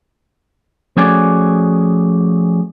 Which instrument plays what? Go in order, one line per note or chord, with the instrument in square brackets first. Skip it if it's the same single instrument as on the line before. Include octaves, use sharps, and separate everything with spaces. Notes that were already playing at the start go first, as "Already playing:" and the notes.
[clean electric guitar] F3 A3 C#4 F#4 G#4 D5